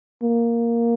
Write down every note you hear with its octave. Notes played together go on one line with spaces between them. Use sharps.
A#3